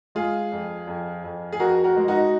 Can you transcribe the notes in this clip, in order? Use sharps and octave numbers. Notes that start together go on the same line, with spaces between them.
G#3 F4 G#4
F2
F2
F2
G#4
F2 F#4 A#4
F#4 A#4
G#3
D#4 F#4